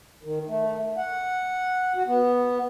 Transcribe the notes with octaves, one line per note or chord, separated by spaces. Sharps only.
D#3
A3
F#5
F#4
B3